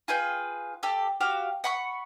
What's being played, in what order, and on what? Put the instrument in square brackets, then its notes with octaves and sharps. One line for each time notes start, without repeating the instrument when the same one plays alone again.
[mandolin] F4 G#4 B4 G5
G4 A4
F#4 G4 F5
F#5 B5 C#6